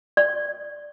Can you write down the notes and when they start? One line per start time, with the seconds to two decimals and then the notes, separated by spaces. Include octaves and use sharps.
0.17 D5